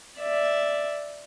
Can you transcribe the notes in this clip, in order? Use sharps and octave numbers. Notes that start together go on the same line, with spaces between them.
D5 E5